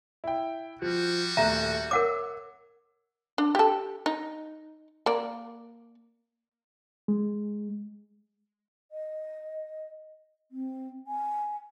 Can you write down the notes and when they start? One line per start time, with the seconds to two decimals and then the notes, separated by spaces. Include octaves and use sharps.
0.24 E4 G5
0.82 F3 G3 F#4
1.37 D#1 A3 E5 A#5 F#6
1.91 A#4 C#5 F#5 D6 E6
3.38 D4
3.55 G4 A4
4.06 D#4
5.06 A#3 D5
7.08 G#3
8.91 D#5
10.51 C4
11.07 G#5